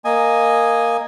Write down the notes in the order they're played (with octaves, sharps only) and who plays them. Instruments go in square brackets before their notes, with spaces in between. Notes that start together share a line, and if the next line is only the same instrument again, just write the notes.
[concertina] A#3 D#5 G#5